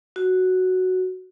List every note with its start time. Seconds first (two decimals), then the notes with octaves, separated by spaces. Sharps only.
0.16 F#4